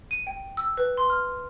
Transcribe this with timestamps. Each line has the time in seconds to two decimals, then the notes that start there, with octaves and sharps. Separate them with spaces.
0.11 D#7
0.27 G5
0.57 E6
0.77 B4
0.97 C6
1.10 F6